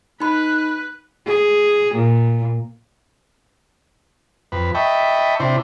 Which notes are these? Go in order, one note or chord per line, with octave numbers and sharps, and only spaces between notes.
D#4 B4 B5 F#6
G#4
A#2
F2 B4
D#5 E5 G5 A5 B5 C#6
C3 D4 E4 C5